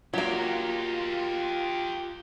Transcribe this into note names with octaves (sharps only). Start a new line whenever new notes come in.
F#3 A#3 F4 G4 A#4